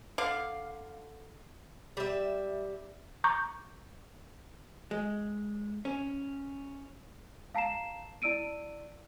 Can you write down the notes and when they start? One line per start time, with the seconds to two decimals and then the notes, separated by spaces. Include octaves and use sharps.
0.18 D3 F5
1.97 G3 E5
3.24 A#5 C#6 D6 G6
4.91 G#3
5.85 C#4
7.55 F5 A5 A#5 C7 E7
8.22 E4 D5 E6 D7 D#7